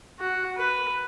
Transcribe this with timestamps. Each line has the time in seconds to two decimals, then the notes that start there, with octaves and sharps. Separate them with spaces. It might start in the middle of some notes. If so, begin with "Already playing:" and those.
0.20 F#4
0.57 B4